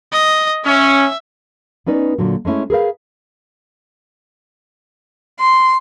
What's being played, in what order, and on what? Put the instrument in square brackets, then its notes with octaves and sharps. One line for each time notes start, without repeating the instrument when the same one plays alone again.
[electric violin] D#5
[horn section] C#4 [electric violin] E5
[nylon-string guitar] B3 C#4 D#4 B4 D5
A#2 D3 F#3
G#3 A3 C#4 E4
G#4 A#4 B4 F5
[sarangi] C6